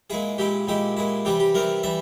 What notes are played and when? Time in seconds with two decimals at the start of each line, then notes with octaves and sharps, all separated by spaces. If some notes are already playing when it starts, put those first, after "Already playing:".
0.10 A#2 G#3 E4 G#4
0.38 A#2 G#3 E4 G4
0.67 A#2 G#3 E4 G4
0.97 A#2 G#3 E4
1.25 C3 E3 G3 G4
1.40 G4
1.54 C3 E3 G3 A#4
1.83 E3 G3 E5